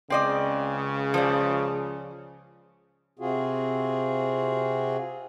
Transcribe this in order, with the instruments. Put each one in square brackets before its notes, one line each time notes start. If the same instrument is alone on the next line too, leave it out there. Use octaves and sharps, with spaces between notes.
[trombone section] C#2 C#3 [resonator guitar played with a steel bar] C4 D5 D#5
[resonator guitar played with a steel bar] F3 C5 D5
[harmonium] C3 C4 F4 F#4 G#4